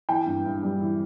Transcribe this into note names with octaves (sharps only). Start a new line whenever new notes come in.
E3 G5
G2
G2
G3
E3